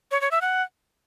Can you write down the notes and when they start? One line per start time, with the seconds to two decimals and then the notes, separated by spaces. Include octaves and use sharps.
0.11 C#5
0.21 C#5
0.31 E5
0.41 F#5